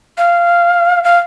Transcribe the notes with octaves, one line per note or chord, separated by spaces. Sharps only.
F5
F5